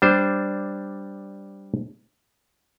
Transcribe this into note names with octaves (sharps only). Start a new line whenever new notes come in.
G3 D4 C5